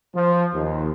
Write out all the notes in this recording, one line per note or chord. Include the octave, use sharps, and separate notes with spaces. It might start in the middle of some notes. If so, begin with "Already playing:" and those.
F3
D#2